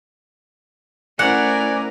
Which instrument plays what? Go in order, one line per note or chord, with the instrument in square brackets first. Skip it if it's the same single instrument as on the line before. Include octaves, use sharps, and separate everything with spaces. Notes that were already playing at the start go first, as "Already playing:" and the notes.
[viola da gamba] A3 E4 A#4 [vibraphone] C#4 C5 [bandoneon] D5 G#5 [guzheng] F#5